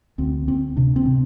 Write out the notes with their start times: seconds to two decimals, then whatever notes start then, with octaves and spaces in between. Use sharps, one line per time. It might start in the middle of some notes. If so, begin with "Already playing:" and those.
0.18 D2 C4
0.47 D2 C4
0.76 C3 D4
0.96 C4
1.06 C3